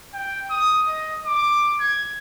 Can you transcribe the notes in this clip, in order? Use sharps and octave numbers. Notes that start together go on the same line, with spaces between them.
G5
D#6
D#5
D6
G#6